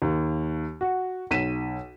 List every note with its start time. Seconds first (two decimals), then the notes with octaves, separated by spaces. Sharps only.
0.02 D#2
0.81 F#4
1.31 B1 B6 D#7 E7